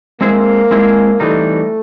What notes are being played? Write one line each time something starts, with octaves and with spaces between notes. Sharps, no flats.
G#3 A#3 C4 E4 G#4 C5
G#3 C4 E4 G#4 C5
E3 G3 A3 C4 D#4